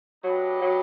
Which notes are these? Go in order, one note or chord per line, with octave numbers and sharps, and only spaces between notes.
F#3 A3 D4 G4 B4 D#5
F#3